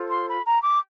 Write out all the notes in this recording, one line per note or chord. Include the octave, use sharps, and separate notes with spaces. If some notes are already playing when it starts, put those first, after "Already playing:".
Already playing: F4 A4 C5
C6
B5
A#5
D6